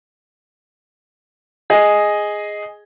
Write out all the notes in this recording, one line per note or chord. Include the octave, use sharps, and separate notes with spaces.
G#4 D#5